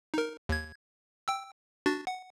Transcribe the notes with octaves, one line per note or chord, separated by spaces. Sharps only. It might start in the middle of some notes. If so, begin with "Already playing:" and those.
D#4 A#4
D#2 G#6
G5 E6
D4 F#4 A6
F#5